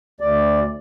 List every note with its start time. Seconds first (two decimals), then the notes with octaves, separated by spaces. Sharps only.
0.20 D2 D5